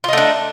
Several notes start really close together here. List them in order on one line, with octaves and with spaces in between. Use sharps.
F4 D#4 A3 D4